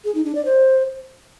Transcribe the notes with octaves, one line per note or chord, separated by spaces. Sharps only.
G#4
D#4
D4
D5
C5